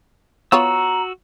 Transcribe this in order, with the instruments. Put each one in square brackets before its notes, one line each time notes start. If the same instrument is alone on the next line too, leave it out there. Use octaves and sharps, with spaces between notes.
[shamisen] B3 F4 C#5 [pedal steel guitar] F#4 E6 [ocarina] A#5